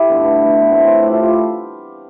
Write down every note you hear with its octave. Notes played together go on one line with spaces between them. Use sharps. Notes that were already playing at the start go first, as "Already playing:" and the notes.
Already playing: E4 G4 A4
G2 D3 A3 B3
B3
B2 A3 B3
B3
A2 E3 A3 C4
C4
C3 F3 A3 G4 B4
F4 A4
G4 B4